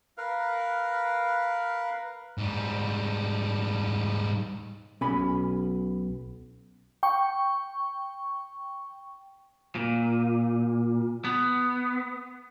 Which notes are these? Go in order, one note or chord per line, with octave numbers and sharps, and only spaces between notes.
A#4 B4 F5
G#2 G3
B1 C#4 G#5 B5
G5 C#6
A#2
B3